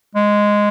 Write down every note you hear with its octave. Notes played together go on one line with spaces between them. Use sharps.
G#3